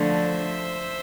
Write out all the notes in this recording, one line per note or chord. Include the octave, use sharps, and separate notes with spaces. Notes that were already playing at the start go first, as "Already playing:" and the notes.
Already playing: D3 F3 A3
C5 E5